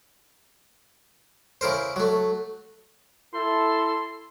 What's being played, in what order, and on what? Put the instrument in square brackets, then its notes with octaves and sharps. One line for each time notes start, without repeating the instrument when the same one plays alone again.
[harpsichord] C#3 E4 A#4 C5
F#3 A3
[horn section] E4 A4 [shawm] C6